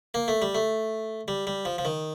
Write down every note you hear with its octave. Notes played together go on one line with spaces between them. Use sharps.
A#3
A3
G3
A3
G3
G3
F3
F3
D#3